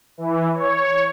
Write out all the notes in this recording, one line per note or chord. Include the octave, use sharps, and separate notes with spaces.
E3
C#5